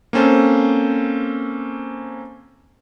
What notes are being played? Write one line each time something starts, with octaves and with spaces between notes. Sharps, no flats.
A#3 C4 C#4 A4 C5